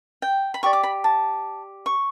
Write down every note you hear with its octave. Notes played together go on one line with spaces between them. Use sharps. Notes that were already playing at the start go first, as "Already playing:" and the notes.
G5
B5
G4 D5 C#6
D6
B5
A5
C#6